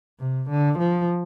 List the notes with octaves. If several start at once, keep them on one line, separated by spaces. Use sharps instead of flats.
C3
D3
F3